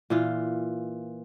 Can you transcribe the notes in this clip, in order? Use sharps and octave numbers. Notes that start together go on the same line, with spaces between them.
A#2 E3 F4